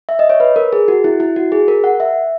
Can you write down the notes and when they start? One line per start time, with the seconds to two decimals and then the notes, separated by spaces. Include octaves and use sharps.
0.09 E5
0.19 D#5
0.30 C#5
0.40 B4
0.56 A#4
0.73 G#4
0.88 F#4
1.04 E4
1.20 E4
1.36 F#4
1.52 G#4
1.68 A#4
1.84 F#5
2.00 E5